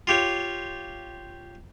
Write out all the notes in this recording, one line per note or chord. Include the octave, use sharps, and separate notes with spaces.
F4 G4 C#5